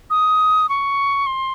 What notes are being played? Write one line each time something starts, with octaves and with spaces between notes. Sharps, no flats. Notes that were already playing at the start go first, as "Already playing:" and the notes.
D#6
C#6
C6